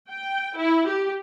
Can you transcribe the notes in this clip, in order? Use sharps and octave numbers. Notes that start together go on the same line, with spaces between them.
G5
E4
G4